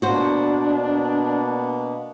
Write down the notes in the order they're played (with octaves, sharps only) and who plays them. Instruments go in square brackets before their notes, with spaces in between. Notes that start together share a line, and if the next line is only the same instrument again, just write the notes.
[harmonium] B2 A#3 B3 [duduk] D4 [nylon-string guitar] F#4 C5